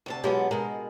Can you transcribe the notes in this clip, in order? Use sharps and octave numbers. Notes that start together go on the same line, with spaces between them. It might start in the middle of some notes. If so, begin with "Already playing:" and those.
D2 C3 A5
B2 F#3 G#3 B3 F4 G4
B2 G#3 A#4